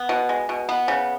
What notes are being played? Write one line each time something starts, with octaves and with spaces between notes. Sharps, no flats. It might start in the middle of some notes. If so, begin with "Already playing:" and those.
Already playing: B3
B2
G#3
B2
B3
C#3